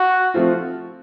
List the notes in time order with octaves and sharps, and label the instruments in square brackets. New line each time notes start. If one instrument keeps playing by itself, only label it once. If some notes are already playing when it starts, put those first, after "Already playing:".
Already playing: [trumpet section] F#4
[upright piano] F3 A3 C4 F4